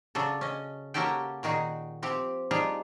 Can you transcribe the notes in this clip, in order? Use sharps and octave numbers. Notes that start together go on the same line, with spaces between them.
C#3 F#3 D4 A4
C#4 D#5
A#3 C#4 F#4 G4 A4 G5
A#2 D#3 D#4 F#4 G#4
F3 C4 G4
G3 D4 D#4 F4 G#4